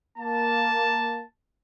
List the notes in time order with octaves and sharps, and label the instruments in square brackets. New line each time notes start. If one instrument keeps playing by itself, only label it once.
[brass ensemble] A#3 A5